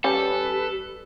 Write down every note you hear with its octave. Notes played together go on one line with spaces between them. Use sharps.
G3 C#4 G4 A4 B4